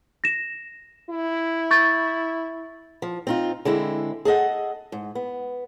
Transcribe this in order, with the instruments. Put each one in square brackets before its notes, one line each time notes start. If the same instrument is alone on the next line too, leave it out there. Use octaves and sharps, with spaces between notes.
[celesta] A#6 E7
[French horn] E4
[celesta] C#6 G6 A6
[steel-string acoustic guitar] F3
C4 D#4 F4
D3 G#3 C4 E4
G#4 A4 D#5 F#5
G#2
B3